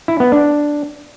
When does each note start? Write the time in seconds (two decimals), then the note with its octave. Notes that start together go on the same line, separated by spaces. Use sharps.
0.08 E4
0.20 B3
0.32 D4